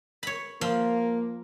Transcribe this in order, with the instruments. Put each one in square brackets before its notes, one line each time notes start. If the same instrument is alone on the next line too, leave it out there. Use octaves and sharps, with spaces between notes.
[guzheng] C#5 B5
[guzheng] F3 F4 [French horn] A#3